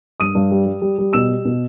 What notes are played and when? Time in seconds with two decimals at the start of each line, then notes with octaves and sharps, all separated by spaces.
0.20 G2 D#6 D#7
0.35 G2
0.51 G3
0.66 G3
0.82 G3
0.98 G3
1.13 B2 E6 E7
1.29 G3
1.45 B2